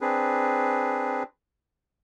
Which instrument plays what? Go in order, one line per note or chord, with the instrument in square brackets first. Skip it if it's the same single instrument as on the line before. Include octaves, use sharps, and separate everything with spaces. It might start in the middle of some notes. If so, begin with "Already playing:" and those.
[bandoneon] C4 D4 G#4 B4